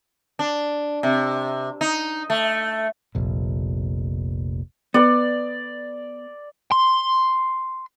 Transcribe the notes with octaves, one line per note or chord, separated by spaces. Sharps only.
D4
C3
D#4
A3
F1 A#1
B3 D5
C6